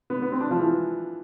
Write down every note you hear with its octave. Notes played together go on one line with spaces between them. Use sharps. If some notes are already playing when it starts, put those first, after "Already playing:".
B3
B3
C4
D4
F3
E3